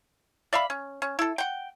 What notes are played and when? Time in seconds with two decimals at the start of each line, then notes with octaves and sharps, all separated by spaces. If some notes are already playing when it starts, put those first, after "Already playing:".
0.53 D5 E5 F5 B5
0.70 C#4
1.02 C#4
1.19 E4 A4
1.38 F#5 G5